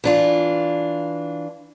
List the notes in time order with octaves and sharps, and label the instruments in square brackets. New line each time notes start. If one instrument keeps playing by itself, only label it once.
[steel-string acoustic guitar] E3 D4 F4